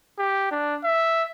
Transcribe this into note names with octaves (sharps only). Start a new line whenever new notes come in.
G4
D4
E5